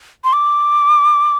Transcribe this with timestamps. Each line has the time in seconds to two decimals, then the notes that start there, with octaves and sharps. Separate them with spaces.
0.24 C6
0.33 D6